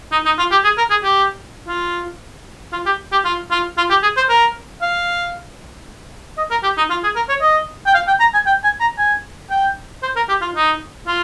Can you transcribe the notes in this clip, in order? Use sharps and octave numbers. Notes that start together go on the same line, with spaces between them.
D#4
D#4
F4
G4
G#4
A#4
G#4
G4
F4
F4
G4
G4
F4
F4
F4
G4
G#4
C5
A#4
F5
D#5
A#4
G4
D#4
F4
G#4
A#4
C#5
D#5
G5
F5
G5
A#5
G#5
G5
G#5
A#5
G#5
G5
C5
A#4
G4
F4
D#4
F4